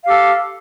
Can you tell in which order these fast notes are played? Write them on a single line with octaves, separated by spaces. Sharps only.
F5 G4 A4